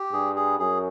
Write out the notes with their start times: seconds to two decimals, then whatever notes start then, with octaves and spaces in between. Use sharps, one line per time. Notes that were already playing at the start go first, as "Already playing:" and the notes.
Already playing: G4
0.13 G2 G#4
0.36 G#4
0.59 F#2 G#4